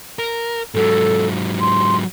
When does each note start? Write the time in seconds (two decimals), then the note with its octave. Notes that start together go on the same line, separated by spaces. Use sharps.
0.19 A#4
0.75 G#2 F#3 A4
1.61 C6